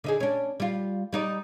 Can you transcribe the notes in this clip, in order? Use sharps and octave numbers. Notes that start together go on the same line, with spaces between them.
D3 D#4 G#4
C#4 D4
G3 F4
G3 D#4 D5